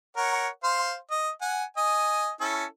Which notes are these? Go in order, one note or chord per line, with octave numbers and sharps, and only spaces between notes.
A#4 C#5 F#5
C5 F5 C6
D#5
F#5 G#5
D#5 G#5
C#4 E4 A4